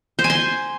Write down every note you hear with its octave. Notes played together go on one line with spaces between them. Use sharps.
C5
G#5
C6